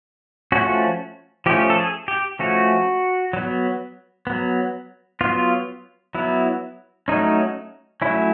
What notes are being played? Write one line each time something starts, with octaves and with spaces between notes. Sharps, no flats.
F3 A3 C#4 F#4
F3 A3 C#4 G4
A4
G#4
G4
F3 A3 C#4 F#4
F#3 B3
F#3 B3
F#3 B3 F4
F#3 B3 E4
F#3 A3 C#4 D#4
F#3 A3 C#4 E4